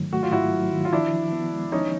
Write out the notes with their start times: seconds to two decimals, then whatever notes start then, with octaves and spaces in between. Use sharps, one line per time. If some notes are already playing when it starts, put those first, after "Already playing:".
Already playing: G#2 D#3 F#3 A3
0.12 A3 F#4
0.23 F4
0.32 G#2 E4 F#4
0.52 F#3
0.72 D#3
0.85 F4
0.92 F3 D4 E4
1.13 F3
1.32 B3
1.52 G#3
1.72 F3 C#4 D#4